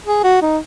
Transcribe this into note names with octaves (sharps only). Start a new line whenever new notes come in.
G#4
F#4
D#4